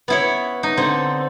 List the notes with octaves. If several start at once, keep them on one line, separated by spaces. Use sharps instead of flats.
B3 E4 C#5
D#4
D3 C4